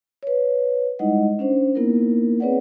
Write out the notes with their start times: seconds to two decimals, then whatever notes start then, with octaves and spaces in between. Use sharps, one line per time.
0.23 B4 C#5
0.99 G3 G#3 D#4 E4 D#5 F#5
1.39 C#4 D4 C5
1.75 A#3 B3 D#4 E4 A#4
2.40 C4 G#4 B4 C#5 D5 F#5